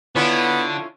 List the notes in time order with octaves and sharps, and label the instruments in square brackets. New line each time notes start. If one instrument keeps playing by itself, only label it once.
[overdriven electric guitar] D3 [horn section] B3 [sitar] C#4 E4 F4